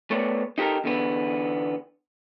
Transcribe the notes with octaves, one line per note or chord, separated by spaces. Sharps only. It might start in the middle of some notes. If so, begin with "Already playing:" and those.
A3 B3 C#5 D5
D#4 G4 A4 A#4
E2 D3 B3